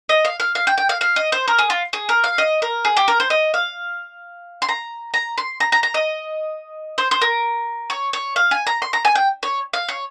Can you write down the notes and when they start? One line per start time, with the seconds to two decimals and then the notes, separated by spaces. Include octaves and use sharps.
0.09 D#5
0.25 F5
0.40 F5
0.55 F5
0.67 G5
0.78 G5
0.89 F5
1.01 F5
1.16 D#5
1.32 C5
1.48 A#4
1.59 G#4
1.70 F4
1.93 G#4
2.09 A#4
2.24 F5
2.38 D#5
2.62 A#4
2.85 G#4
2.97 G4
3.08 A#4
3.20 C5
3.30 D#5
3.54 F5
4.62 C6
4.69 A#5
5.14 A#5
5.38 C6
5.60 A#5
5.72 A#5
5.83 A#5
5.94 D#5
6.98 C5
7.11 C5
7.21 A#4
7.90 C#5
8.13 C#5
8.36 F5
8.51 G#5
8.67 A#5
8.82 C6
8.93 A#5
9.05 G#5
9.15 G5
9.43 C#5
9.73 F5
9.88 C#5